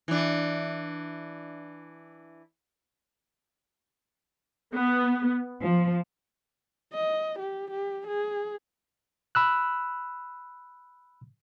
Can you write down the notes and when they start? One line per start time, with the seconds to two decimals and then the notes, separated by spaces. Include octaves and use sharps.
0.08 E3 D4
4.74 B3
5.63 F3
6.94 D#5
7.39 G4
7.71 G4
8.07 G#4
9.35 B5 E6 F#6